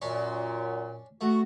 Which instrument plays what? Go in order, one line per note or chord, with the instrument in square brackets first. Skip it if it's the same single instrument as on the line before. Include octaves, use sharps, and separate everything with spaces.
[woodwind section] F#2 A#2 [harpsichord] C#4 D4
[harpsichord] A3 [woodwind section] F#4